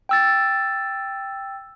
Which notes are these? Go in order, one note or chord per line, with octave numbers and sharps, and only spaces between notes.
G5 E6 A6